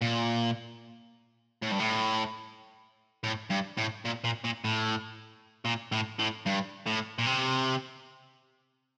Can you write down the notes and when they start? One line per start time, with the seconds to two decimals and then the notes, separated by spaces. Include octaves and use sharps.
0.02 A#2
1.63 A2
1.71 G2
1.80 A2
3.23 A2
3.50 G2
3.77 A2
4.05 A#2
4.24 A#2
4.44 A#2
4.64 A2
5.65 A#2
5.92 A2
6.19 A2
6.46 G2
6.86 A2
7.19 A#2
7.26 C3